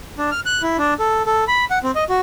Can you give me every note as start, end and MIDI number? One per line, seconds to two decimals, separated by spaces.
0.18 0.30 62
0.31 0.40 89
0.46 0.62 90
0.62 0.77 64
0.78 0.94 62
0.99 1.22 69
1.26 1.44 69
1.48 1.65 83
1.70 1.79 78
1.83 1.91 60
1.95 2.04 75
2.09 2.21 66